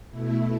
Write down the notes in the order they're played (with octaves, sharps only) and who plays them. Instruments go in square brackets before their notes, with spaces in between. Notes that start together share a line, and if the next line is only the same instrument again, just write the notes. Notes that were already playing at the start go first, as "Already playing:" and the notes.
[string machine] B2 A3 E4